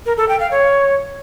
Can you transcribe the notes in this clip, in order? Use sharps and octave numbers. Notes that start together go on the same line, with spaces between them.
A#4
A4
G5
F5
C#5